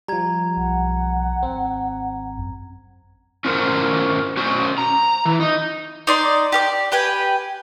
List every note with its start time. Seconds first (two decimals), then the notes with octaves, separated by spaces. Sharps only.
0.08 F3 G3 A#5 G#6
0.57 B1 F#5
1.43 G#1 C4
2.38 F#2
3.45 C#4 F4 F#4 A#4 C5
4.37 C#4 F#4 C5 C#5
4.78 A#5
5.25 E3
5.40 D#4
6.07 D#4 D5 C6
6.52 G4 A#4 D5
6.92 G4 B4 G5 G#5